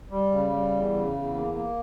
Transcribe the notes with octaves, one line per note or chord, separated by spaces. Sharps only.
G3
C#3
G3
E2
C#3
E2
A#3
A#3